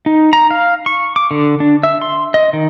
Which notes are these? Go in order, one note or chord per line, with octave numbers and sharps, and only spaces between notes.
D#4
A#5
F5
C#6
D6
D3
D4
E5
C6
D#5
D#3